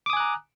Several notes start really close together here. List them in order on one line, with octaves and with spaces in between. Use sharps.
D6 D#6 G#5 F#6 A#5